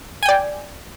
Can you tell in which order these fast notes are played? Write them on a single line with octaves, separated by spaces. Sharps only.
G#5 G5 D5